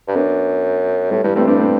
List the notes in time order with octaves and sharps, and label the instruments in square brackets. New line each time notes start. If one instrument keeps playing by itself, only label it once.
[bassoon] G2
[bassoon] F#2 [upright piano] B3 D4
[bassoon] A2 [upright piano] G3 B3
[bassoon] G2 [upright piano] E3 G3
[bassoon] G2 [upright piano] A3 C4
[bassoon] G2 [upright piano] B3 D4
[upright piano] A3 C4